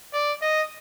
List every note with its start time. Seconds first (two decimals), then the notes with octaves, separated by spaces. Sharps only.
0.13 D5
0.42 D#5